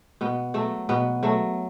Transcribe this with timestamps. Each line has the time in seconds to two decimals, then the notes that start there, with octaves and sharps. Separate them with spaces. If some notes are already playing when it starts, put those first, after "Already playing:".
0.21 B2 B3
0.54 F#3 A3
0.89 B2 B3
1.23 F#3 A3